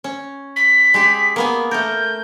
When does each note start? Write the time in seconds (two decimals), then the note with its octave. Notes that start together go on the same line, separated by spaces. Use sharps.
0.04 C#4
0.56 B6
0.94 G#3 G4 G#4
1.36 A#3 B3 G#5
1.71 A3 A#4 G6